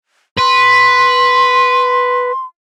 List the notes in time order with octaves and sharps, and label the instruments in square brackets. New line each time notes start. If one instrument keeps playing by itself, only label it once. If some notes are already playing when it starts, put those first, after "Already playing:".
[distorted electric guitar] B4 [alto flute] C6